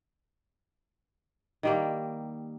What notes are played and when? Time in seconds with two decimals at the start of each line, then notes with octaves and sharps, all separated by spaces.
1.63 D#3 G3 A#3